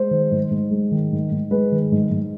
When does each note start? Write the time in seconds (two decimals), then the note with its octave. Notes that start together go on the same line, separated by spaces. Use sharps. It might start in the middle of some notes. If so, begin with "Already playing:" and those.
Already playing: G#3 C5
0.11 D#3
0.31 G#2
0.51 G#2
0.71 G#3
0.92 D#3
1.12 G#2
1.31 G#2
1.51 G#3 B4
1.72 D#3
1.92 G#2
2.11 G#2